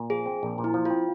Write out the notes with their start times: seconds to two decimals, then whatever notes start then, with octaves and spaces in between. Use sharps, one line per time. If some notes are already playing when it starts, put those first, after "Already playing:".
Already playing: A#2
0.10 F3 G#4
0.26 C4
0.43 A#1
0.58 A#2
0.64 E4
0.74 F3
0.85 C4 F4